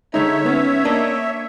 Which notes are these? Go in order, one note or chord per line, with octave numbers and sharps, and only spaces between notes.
D3 G#3 D#4 C#5 E5
B3 C#4
A#3 D4 D#5